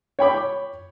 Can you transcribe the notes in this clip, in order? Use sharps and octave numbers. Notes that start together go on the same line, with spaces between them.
C#5 G5 B5 D6